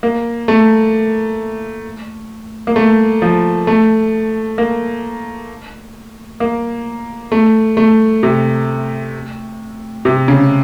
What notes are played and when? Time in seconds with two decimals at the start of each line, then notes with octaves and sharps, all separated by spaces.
0.03 A#3
0.48 A3
2.67 A#3
2.76 A3
3.22 F3
3.67 A3
4.58 A#3
6.40 A#3
7.32 A3
7.77 A3
8.23 C3
10.05 C3
10.28 C#3